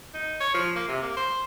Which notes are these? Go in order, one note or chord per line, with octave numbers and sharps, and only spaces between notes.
D#4
C#5
F3
A#3
C3
A#3
C5